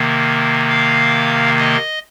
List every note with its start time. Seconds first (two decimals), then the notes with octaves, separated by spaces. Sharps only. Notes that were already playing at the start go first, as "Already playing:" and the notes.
Already playing: C3 D#3 A#3
0.70 F5
1.59 D#5